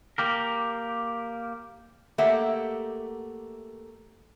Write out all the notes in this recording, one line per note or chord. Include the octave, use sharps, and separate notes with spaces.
A#3 G4 A#4
A3 A#3 G4 E5 F#5